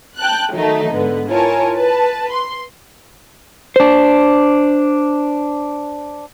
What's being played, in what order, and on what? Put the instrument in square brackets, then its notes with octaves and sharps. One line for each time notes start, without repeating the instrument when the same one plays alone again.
[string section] G5 A5 F#6
D#3 F#3 A3 D#4
G#2 D3 B3
E4 F4 A#4 C#5 G#5 A5
B4 A5
C6
[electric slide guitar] D4 C5